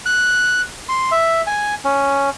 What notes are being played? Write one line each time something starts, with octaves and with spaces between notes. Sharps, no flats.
F#6
C6
E5
G#5
C#4